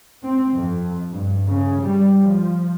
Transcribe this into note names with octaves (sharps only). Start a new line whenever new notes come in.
C4
F2
G2
C#3
G3
F3